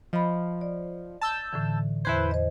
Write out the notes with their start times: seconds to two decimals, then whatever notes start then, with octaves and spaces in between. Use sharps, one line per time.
0.13 F3 D#5 B5
0.61 D5
1.21 A5 E6 G6
1.53 A2 D3 E3
2.05 E2 E4 B4 C5 G#6
2.31 C5 D#5